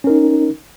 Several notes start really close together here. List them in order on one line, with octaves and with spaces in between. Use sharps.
C#4 A#4 D#4